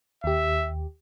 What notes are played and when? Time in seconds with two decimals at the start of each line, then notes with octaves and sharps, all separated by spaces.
0.24 D#2 G4 E5